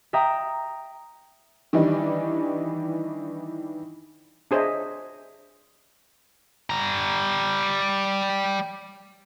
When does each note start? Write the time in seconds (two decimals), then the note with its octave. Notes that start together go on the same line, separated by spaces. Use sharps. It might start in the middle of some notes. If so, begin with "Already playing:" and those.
0.13 E5 G5 A#5 D#6
1.73 D#3 E3 G3 D4 D#4
4.51 D4 G#4 C5 C#5 D#5 E5
6.70 G3 A#5